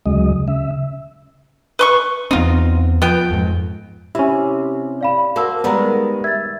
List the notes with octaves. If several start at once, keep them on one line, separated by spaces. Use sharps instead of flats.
D2 C#3 F#3 G#3 D#5
C#3 E5
B4 C6 C#6
E2 B3 C4 D#4 F4
F3 B3 G5
F2 G#2
C3 C#4 E4 G4
D5 F5 B5
A#3 F#4 C5 F5 A5 E6
D#3 G3 G#3 B3 A#5 B5
E5 G#6 A6